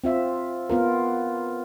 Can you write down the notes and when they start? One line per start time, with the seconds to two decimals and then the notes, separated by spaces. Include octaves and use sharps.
0.04 C4 F4 E5
0.70 B3 F4 A#4